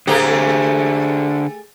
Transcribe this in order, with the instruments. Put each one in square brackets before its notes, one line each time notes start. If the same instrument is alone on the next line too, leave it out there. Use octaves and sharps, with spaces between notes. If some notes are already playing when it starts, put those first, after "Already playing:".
[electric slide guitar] D3 C5 A#5 [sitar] A3 G4 G#4